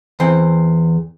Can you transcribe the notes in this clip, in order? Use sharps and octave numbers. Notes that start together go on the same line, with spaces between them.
E2 C4